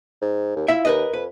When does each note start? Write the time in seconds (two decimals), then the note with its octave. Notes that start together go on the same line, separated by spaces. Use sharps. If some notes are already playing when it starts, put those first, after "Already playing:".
0.22 G#2
0.56 D#2
0.68 E4 F4 E5
0.85 D#2 A#4 B4 D#5
1.14 F2 B4